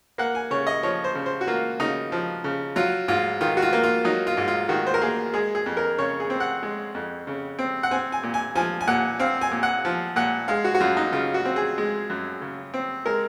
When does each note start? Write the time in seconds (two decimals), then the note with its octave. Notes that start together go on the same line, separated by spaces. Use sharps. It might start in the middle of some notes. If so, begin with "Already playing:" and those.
0.18 A#3 F#5
0.35 G#5
0.51 C#3 C#5
0.67 D#5
0.83 F3 C#5
1.04 C5
1.15 C#3
1.26 C5
1.41 F#4
1.47 A#3 F4
1.80 C#3 D#4
2.12 F3
2.44 C#3
2.76 F#3 F4
3.08 G#2 F4
3.41 D#3 F4
3.57 F#4
3.62 F4
3.73 A#3
3.83 F4
4.05 F#3 D#4
4.27 F4
4.37 G#2
4.48 F4
4.69 D#3 F#4
4.87 C5
4.94 A#4
5.02 A#3 G#4
5.34 G#3 G#4
5.55 G#4
5.66 F2
5.77 A#4
5.98 C#3 C#5
6.20 G#4
6.30 C4
6.40 F#5
6.63 G#3
6.95 F2
7.27 C#3
7.59 C4
7.83 F#5
7.91 C4 G#5
8.12 G#5
8.23 A#2
8.34 G#5
8.55 F3 G#5
8.81 G#5
8.88 A#2 F#5
9.19 C4 F5
9.41 G#5
9.51 A#2
9.63 F#5
9.85 F3
10.16 A#2 F#5
10.48 G#3 F5
10.64 F#4
10.74 F#4
10.80 F#2 F4
10.97 D#4
11.12 C#3 F4
11.34 F#4
11.45 C4
11.56 G#4
11.78 G#3
12.10 F#2
12.41 C#3
12.74 C4
13.05 G#3 A#4